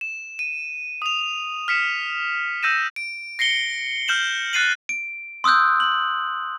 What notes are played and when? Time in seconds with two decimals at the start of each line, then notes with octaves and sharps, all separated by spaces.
0.01 E7
0.39 D#7
1.02 D#6 F7
1.68 F6 B6 C#7 E7
2.63 E6 G6 A#6 D#7 E7
2.96 D7
3.39 A#6 C7 C#7 G7
4.08 F6 G6 E7 F#7
4.53 F#6 A6 C7 D#7 F#7
4.89 D7
5.44 C6 D#6 E6 F#6 G6
5.80 F#7